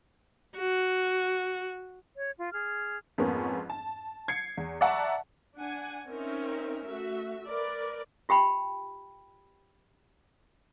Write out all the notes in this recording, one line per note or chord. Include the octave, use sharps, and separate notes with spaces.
F#4
C#5
F4
G#4 F6
F2 G#2 A#3 B3 C#4
A5
G#6 C7 C#7
E2
D5 E5 F#5 A5 A#5 C#6
D4 F#5 G#5
C4 C#4 D#4 A#4 E5
A3 F#4 E5
A#4 B4 D5
F4 G4 G5 B5